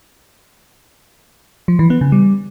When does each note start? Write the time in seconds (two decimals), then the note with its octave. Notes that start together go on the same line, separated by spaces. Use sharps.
1.68 F3
1.79 E3
1.90 B3
2.01 C#3
2.12 G3